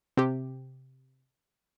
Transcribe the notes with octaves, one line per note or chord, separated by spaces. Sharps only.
C3 G4